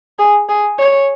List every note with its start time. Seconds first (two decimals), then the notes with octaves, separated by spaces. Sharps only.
0.19 G#4
0.49 G#4
0.79 C#5